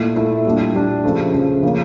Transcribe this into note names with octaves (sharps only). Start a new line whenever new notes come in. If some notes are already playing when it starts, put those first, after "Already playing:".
Already playing: A#2 A3 E4
A#2 A3 E4
A#2 G3 D4
A#2 G3 D4
C#3 F3 A3
C#3 F3 A3
C#3 F3 A#3 C#4